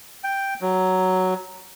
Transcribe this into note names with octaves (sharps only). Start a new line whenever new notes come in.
G5
F#3